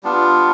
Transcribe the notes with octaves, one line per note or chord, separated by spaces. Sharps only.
G3 B3 D4 F4